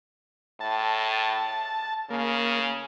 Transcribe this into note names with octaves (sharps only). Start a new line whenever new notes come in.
A2 A5
C#3 A#3